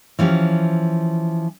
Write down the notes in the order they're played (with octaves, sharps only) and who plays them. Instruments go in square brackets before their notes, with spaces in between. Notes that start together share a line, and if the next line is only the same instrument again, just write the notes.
[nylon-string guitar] E3 F3 C#4 G4